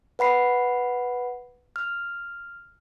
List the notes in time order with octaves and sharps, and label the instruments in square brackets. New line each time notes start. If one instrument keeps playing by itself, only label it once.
[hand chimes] B4 F#5 B5 C7
F6